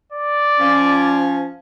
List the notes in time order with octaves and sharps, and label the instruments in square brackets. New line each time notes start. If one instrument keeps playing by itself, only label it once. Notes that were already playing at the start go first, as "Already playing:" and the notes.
[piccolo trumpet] D5
[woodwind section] F3 C#4